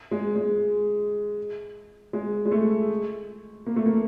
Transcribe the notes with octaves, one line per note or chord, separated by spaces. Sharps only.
G#3
G#3
G#3
G#3
A3
A#3
A3
A#3